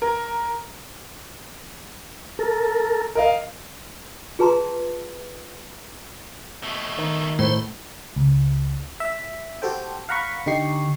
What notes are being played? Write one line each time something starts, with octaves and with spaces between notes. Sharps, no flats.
A#4
A4 A#4
A#4 D#5 F5
F4 G#4 B4 A5 A#5 C6
B2 A3
D#3
A2 A3 C5
C#2
E5
F#4 G4 A4 C5 G5
F5 F#5 A#5 B5 C#6
D3 D#4 G4 C#6 C7